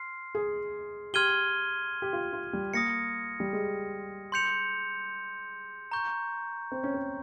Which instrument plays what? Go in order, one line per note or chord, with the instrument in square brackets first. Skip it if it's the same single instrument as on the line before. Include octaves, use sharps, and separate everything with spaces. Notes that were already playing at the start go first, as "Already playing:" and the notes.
Already playing: [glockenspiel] C6 F6 C7
[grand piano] G#4
[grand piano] G4 [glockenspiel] C6 F6 G#6 D#7 G7
[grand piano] G4
F4
F4
G3
[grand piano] A#3 [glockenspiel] D#6 A#6 C#7
[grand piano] G3
G#3
[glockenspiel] C6 G6 C#7 F7
A#5 C#6 G6
[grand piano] C4
C#4
C4